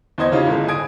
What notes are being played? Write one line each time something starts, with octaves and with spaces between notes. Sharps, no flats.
E2 C5 D#5 G#6
C#3 E3 C#4 D#4 F4 G4
G1 A2 G#3
G#5 D#6 G#6 D7